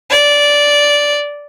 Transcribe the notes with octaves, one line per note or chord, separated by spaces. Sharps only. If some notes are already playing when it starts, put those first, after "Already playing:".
D5